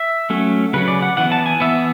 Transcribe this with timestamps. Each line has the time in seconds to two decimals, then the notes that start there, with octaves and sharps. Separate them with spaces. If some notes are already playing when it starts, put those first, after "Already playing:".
Already playing: E5
0.30 F#3 A3 C#4
0.73 C#3 F#3 C#4 B4
0.88 D5
1.02 F#5
1.17 E3 B3 F#5
1.32 A5
1.46 G#5
1.60 E3 B3 E5